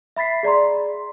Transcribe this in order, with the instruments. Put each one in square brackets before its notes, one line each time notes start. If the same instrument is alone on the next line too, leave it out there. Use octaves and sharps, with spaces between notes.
[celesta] E5 B5 A6 B6 C7
G#4 D5 A#5 C6